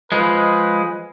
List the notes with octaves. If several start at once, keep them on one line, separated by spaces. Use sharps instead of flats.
F3 G#3 B4